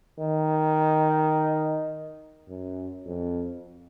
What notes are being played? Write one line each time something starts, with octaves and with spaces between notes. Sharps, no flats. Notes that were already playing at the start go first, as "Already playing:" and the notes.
D#3
F#2
F2